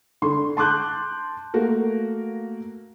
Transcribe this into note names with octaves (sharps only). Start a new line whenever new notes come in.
D3 C6
A5 C6 D6 F#6 G6
A3 A#3 F#4 A#4